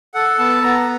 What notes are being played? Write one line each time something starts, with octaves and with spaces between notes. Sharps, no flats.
A4 F#5
B3 A5
B3 A#5